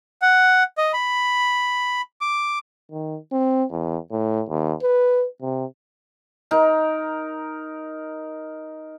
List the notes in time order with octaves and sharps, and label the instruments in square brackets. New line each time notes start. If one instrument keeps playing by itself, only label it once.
[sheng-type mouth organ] F#5
D#5
B5
D6
[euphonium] D#3
C4
E2
A2
D#2
B4
C3
[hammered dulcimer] D#4 A#4